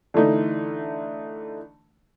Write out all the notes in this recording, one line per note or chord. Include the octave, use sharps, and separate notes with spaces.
D3 E3 A3 D#4